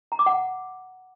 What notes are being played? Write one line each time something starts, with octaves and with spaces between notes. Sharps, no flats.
A#5
D6
F#5